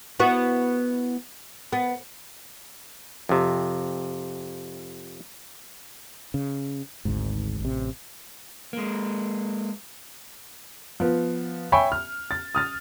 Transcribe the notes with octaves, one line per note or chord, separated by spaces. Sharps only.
B3 E4 F#4
B3
F2 C3
C#3
G#1 D2 G#2
A1 C3
G#3 A#3
F3 B3
C#5 E5 G5 G#5 B5 C#6
F6
A6
D#6 F6 A6